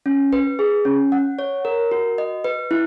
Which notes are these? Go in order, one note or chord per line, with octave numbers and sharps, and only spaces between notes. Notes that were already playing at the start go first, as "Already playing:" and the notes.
C#4
B4
G#4
C#4
F#5
C#5
A#4
F#4
D#5
B4
E4